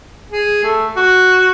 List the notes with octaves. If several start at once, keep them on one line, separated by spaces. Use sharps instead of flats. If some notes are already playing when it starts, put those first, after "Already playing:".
G#4
A3
F#4